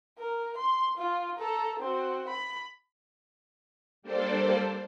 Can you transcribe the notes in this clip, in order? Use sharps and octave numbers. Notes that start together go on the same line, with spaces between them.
A#4
C6
F4
A4 A#5
C4 F#4
B5
G3 A#3 D4 A4 C5 D5